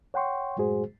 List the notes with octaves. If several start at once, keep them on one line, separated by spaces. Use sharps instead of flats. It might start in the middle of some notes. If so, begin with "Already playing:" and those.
C#5 F#5 G5 C6 C#6
F#2 A2 G#3 F#4 G#4 C5